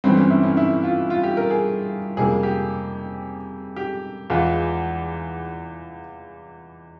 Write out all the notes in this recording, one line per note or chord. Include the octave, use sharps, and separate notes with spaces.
G1 G2 E3 C4
C#4
E4
C#4
E4
F4
F4
G4
A#4
G#4
F2 C3 G3 A#3 G#4
G4
G4
E2 E3 G#3 F4